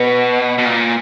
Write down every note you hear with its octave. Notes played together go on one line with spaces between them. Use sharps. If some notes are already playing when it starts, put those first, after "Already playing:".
Already playing: B2 B4
B2
A#2